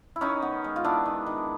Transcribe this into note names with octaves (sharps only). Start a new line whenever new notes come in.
E4
D#3 C#4 D#4
B3
G#3
F4
B3 D4 E4
D#3
D#3